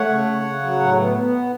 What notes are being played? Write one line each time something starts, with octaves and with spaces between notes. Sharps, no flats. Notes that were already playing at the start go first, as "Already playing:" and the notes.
Already playing: A3 C#5 F#5
C#3
C#3
C#3
F#3
A2
B3
B3